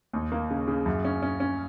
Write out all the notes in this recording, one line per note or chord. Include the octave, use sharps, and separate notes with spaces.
D#2
A#3
C#3
C#3
F#2
C#4
C#4
C#4